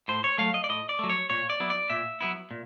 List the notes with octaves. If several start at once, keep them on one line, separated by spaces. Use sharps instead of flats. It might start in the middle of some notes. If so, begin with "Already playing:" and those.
A2 C5
C#5
F#3 A3 F5
D#5
D5
A2 D#5
D5
F#3 A3
C#5
A#2 C#5
D5
F#3 B3 E4
D5
A#2 E5
F#3 B3 E4
A#2